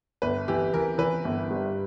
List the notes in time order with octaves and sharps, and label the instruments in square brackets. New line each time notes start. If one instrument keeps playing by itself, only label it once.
[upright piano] G1 [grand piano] B4
[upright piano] E3 [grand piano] G4
[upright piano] E3 [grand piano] A#4
[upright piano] E3 [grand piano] B4
[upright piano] G1
G2